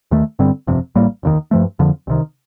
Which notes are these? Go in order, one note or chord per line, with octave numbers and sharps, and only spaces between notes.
D#2 D#3 A3
G2 D3 G3 C4
G1 F2 C3
A1 A2 G3 A#3
F1 D#2 D#3
G2 F3 A3
F2 D3 F3
C2 C3 D#3